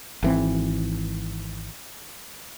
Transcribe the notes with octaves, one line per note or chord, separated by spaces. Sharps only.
G#1 E3 C4